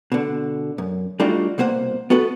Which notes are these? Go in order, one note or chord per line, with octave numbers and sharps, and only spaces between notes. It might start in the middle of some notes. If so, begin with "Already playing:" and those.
B2 D3
F#2
G3 A3 D4 D#4 F4 F#4
C2 B2 A#3 C5 F#5
B3 F#4 A4 B4